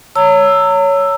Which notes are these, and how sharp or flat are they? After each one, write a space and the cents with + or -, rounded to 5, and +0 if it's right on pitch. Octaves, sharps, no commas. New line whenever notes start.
C#5 +10 A#5 -40 E6 +5